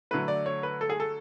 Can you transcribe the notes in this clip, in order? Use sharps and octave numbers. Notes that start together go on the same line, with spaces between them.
D3 F#3 A3 B4
D5
C#5
B4
A4
G#4
A4